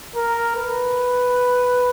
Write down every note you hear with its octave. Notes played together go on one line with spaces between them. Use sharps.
A#4
B4